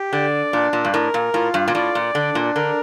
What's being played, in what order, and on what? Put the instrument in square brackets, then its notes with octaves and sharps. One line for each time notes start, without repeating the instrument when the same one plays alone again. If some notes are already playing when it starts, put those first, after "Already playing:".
Already playing: [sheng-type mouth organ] G4
[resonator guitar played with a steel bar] D3 [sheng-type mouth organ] D5
[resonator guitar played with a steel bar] A#2 [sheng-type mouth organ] D4
[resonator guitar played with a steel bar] A#2
G2
[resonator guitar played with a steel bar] A2 [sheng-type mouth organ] A#4
[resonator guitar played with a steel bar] A#2
[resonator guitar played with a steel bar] A2 [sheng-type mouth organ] F4
[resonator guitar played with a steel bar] G2
A#2
[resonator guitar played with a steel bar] A2 [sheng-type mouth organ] D5
[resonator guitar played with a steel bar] A#2
[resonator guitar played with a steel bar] D3 [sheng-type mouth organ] D4
[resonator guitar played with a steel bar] A#2
[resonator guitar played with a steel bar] D3 [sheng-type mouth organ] A#4